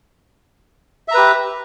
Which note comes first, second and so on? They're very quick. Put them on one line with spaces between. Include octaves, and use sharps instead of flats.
E5 A#5 B4 G4